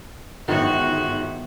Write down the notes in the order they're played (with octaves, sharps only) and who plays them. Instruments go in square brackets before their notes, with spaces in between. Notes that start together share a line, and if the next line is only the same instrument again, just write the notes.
[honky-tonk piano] G1 G#2 [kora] D#3 B3 [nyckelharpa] F#4